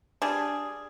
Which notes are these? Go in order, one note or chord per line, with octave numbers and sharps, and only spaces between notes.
G3 D4 G#4